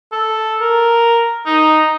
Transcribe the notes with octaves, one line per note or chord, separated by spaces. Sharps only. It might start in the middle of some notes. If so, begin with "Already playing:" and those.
A4
A#4
D#4